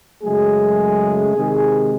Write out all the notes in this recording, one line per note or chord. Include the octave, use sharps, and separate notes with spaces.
F#2 C#3 F#3 G#3 A3 G#4
C3 D#3 G#3